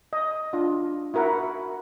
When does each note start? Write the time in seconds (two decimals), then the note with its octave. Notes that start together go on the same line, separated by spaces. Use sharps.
0.13 D#5
0.53 D4 F4
1.14 E4 F#4 A#4 E5 F#5